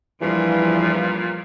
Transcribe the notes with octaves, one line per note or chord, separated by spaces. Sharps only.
E2 G2 A#2 E3 F3 G3